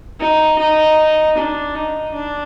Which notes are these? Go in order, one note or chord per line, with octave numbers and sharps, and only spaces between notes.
D#4
D#4
D4
D#4
D4